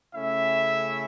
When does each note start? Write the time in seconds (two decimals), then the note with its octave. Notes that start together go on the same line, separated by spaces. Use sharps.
0.14 C#3 A3 C#4 E4 E5